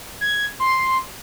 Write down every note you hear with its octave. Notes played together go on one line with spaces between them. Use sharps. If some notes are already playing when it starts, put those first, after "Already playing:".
G#6
C6